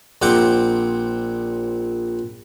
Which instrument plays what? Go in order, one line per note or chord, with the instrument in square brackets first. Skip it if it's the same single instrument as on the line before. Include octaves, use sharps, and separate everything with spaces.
[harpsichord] A#1 C4 F#5 G5 D6